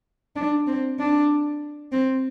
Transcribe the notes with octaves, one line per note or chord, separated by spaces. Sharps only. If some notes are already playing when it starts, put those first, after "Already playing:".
D4
C4
D4
C4